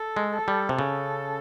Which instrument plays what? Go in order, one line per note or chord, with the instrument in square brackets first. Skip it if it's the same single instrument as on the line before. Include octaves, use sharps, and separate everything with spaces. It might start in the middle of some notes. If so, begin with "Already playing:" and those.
Already playing: [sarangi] A4
[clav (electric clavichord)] G#3
[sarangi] A4
[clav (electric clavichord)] G3
C3
[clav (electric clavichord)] C#3 [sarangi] A4